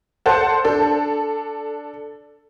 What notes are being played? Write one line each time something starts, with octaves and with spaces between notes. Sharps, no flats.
A4 C5 F#5 A5
D4 A4